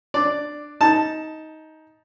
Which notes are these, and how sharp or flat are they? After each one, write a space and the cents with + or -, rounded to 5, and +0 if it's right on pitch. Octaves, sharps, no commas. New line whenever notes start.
D4 +15 D5 +0
D#4 +15 A5 +0